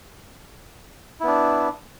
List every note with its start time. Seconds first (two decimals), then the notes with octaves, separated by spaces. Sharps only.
1.20 E4
1.24 B3
1.27 D4